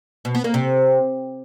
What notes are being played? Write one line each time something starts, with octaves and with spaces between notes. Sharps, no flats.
B2
B3
A#3
C3